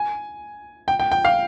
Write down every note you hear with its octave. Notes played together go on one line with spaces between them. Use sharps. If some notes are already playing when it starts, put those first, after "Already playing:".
Already playing: G#5
G5
G5
G5
F5